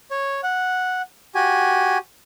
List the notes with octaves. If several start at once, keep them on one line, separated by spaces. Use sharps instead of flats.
C#5
F#5
F#4 G4 G#5